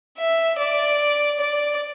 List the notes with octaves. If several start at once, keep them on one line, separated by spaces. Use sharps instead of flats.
E5
D5
D5